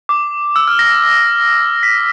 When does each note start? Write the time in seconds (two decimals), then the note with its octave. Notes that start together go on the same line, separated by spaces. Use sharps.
0.09 D6
0.56 E6
0.67 F6
0.79 A#6
1.83 B6